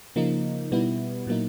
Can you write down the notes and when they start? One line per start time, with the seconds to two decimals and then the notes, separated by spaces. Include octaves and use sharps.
0.16 C#3 F3 A#3 D#4
0.72 B2 G3 B3 E4
1.27 A#2 F#3 A#3 D#4